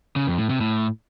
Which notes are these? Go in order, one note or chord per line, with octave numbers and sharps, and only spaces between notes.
C#3
F2
A2
C3
A2